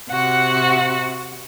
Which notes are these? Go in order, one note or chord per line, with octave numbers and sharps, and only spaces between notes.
C3 F#4 F#5